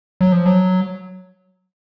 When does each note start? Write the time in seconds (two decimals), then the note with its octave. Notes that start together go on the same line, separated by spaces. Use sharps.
0.21 F#3
0.32 F3
0.46 F#3